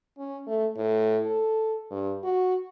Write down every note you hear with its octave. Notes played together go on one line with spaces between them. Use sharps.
C#4
A3
A2
A4
G2
F#4